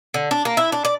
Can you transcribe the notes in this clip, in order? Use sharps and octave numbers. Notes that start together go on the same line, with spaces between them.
D3
D4
A#3
E4
D4
D5